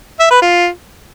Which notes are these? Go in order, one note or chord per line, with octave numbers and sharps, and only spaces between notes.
E5
B4
F4